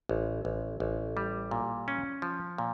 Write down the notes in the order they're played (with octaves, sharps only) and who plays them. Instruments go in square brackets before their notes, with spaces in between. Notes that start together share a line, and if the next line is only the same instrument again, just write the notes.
[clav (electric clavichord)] A1
A1
A1
G3
A#2
C#4
F3
A#2